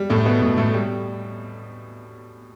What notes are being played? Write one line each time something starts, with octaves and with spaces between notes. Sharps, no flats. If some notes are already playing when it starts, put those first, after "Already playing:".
Already playing: G3
A2 A3
B2 B3
A2 A3
A2 A3
G3